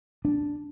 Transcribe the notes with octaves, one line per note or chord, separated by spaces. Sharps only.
D4